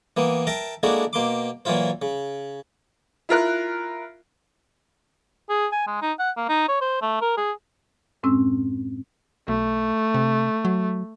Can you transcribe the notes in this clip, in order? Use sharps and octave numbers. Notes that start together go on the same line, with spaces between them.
E3 A#3 B3
A#4 E5 G5 A5 A#5
G#3 A#3 D4 E4 F#4 A4
B2 A#3 C6 D6
A#2 E3 F#3 E4 F4 C5
C#3
E4 F4 A#4 F#6
G#4
G#5
G#3
D#4
F#5
A#3
D#4
C#5
C5
A3
A#4
G#4
F#2 A2 G#3 C4 C#4 E6
B1 A3
C3
F#3